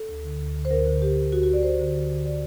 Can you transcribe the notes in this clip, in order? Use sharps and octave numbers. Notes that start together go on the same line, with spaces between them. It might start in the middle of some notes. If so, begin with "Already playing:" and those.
Already playing: A4
D2
D3
D2
D3
C5
D2 A#4
D3
D2 G4
D3
D2 F#4
D3 F#4
D5
D2 C5
D3
D2
D3
D5